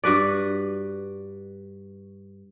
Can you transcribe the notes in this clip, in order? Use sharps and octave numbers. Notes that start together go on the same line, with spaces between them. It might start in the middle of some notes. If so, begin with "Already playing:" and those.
G2 F#4 B4 D5